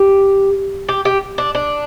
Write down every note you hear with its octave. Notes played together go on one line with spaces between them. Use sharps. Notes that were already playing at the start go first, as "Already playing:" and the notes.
Already playing: G4
G4
G4
D4
D4